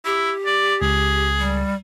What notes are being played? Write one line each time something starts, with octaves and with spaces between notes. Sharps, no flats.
E4 G4
D5
C#2 G#4
G3